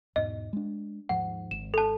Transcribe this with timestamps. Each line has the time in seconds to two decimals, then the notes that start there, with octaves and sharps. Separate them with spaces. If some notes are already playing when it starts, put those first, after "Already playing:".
0.16 E2 G#2 B2 D#5
0.53 G#3 D4
1.09 D#2 G#2 F3 F#5
1.51 G#1 E7
1.74 A4 A5